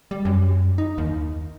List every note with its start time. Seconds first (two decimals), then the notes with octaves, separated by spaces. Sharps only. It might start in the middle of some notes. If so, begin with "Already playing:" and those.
0.11 G3
0.25 F#2
0.78 D#4
0.98 D#2